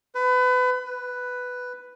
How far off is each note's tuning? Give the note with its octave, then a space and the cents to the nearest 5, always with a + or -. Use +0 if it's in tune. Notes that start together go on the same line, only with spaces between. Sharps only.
B4 +30
B4 +5